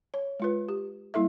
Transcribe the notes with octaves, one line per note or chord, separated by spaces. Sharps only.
C#5
G#3 F4 B4
G4
G3 A#3 E4 A4 E5